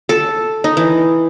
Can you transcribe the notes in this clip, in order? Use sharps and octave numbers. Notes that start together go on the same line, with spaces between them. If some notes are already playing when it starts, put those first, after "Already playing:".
A4
D#4
E3